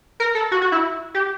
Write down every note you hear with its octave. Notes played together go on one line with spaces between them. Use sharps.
A#4
A4
F#4
F#4
E4
G4